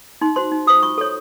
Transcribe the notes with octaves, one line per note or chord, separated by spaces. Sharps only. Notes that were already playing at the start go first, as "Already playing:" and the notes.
D#4 C6
F#4 C5 C6
D#4
F#4 C5 D#6
F4 C#6
A4 C#5